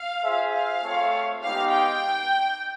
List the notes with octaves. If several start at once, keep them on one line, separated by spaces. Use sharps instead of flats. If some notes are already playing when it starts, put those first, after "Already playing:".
Already playing: F5
F4 G#4 C5 E5
F5
A3 C4 F4 A4 C#5
G#3 B3 D#4 G4 F5
G5